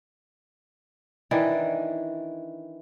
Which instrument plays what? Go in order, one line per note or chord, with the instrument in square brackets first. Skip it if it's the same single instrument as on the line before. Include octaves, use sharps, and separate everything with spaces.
[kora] D#3 E3 D4